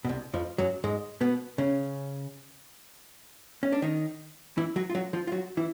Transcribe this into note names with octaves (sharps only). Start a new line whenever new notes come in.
B2
C2 C3
F2 F3
F#2 F#3
G#2 G#3
B2 B3
C#3 C#4
C#4
D4
D#3 D#4
E3 E4
F#3 F#4
F4
F#3 F#4
F3 F4
F4
F#3 F#4
E3 E4